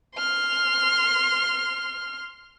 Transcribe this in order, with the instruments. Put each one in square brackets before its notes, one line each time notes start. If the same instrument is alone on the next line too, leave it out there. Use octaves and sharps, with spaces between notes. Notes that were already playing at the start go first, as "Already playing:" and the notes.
[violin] C6 F6